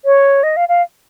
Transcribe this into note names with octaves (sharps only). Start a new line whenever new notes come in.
C#5
D#5
F5
F5